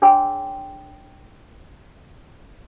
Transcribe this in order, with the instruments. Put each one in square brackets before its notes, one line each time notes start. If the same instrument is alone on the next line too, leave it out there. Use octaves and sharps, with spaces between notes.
[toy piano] D4 G#4 C#5 G5 C6 E6